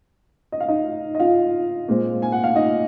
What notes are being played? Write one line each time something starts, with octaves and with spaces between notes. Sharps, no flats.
D#5
F5
D#4 D#5
D#5
F4 F5
A#2 G#3 C4
G#5
F#5
F5
D#4 D#5